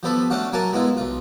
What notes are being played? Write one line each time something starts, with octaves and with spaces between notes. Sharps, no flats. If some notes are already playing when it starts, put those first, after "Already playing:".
F3 G3 B3 A4 B5
A3 C#4 D4 F#4 F5
F#3 A#3 A#4 G#5 A5
G#3 B3 E4 F4
B1 F4